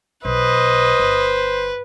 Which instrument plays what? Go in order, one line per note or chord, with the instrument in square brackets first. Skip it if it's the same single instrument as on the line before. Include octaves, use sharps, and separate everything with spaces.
[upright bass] B1 [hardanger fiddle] B4 [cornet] C5 [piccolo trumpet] D#5
[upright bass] G1